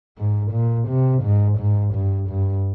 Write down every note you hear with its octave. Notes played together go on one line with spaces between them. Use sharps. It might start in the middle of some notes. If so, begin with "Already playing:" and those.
G#2
A#2
C3
G#2
G#2
G2
G2